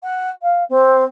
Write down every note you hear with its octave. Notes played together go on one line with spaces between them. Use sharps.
F#5
F5
C4